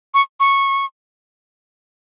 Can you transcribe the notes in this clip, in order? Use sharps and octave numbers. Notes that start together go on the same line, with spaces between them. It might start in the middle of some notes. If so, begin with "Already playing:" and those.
C#6
C#6